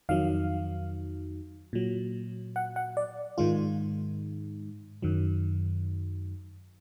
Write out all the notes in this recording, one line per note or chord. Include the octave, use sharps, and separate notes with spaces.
F2 D#3 F#3 F5
A#2 F#3
F#5
F#5
D5
G#2 D#3 G#3 F4
F#2 D#3 F#3